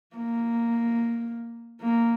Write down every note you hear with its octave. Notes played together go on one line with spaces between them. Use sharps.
A#3
A#3